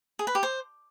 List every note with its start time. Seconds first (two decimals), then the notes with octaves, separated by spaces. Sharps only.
0.19 G#4
0.27 B4
0.35 G4
0.43 C5